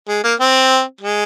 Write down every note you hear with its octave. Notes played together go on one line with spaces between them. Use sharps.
G#3
A#3
C4
G#3